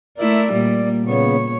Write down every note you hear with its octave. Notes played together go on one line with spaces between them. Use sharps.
A3 E4 A#4 D5
A#2 G3 A#3
A#2 C#3 B3 C#5